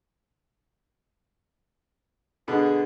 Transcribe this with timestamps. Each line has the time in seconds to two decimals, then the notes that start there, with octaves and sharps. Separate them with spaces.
2.48 B2 D3 B3 G#4